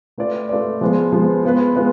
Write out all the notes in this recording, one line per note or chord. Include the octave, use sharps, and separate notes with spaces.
A3 F4 B4 D5
A3 F4 B4 D5
F3 G#3 B3 F4
F3 G#3 B3 F4
G#3 B3 F4 B4
G#3 B3 F4 B4